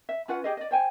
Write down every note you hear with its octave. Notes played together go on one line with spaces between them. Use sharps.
E5
C#4 F4 B4 F#5
G4 G#4 D#5
D5 D#5
C5 G5 G#5